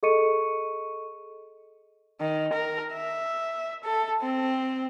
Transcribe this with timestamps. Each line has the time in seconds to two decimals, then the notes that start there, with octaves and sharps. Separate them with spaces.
0.03 G#4 A4 D#5 C#6 C#7 D#7
2.20 D#3
2.53 A#4
2.94 E5
3.84 A4
4.22 C4